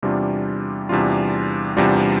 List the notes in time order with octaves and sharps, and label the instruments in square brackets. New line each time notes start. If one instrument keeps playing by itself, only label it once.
[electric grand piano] E2 C3 G3 D4 F4
E2 C3 G3 D4 F4
E2 C3 G3 D4 F4